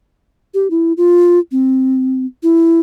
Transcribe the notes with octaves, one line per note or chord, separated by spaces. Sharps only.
G4
E4
F4
C4
E4